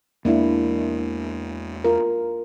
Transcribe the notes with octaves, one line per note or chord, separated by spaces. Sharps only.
E2 G#3 A#3 D4 E4
F4 A#4